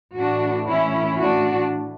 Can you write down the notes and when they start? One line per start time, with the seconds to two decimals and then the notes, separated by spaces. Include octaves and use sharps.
0.17 A2 E3 D4 F#4
0.69 C#4 E4
1.21 D4 F#4